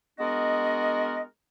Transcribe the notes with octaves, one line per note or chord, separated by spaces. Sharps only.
G#3 B3 D4 F#4 A#4 D#5